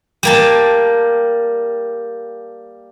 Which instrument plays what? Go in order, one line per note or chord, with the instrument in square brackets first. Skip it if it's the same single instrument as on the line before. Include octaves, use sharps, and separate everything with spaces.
[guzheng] G3 A#3 A5